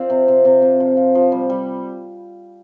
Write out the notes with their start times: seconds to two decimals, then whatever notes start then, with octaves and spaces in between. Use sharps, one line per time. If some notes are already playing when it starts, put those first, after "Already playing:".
Already playing: F3 C4 C5 D5 F5
0.10 C3
0.28 C3
0.45 C3
0.62 C3
0.80 F3
0.97 F3
1.15 F3
1.32 G3
1.50 G3